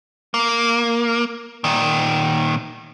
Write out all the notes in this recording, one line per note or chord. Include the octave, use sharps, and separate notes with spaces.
A#3
A#2 D#3